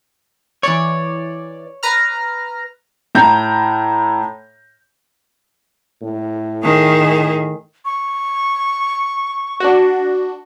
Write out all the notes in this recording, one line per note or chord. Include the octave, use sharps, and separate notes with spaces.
E3 C#5 D5
B4 A#5 F6
A2 A#5 G6
A2
D#3 G#4
C#6
D4 F#4